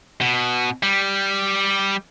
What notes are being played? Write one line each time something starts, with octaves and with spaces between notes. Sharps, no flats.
B2
G3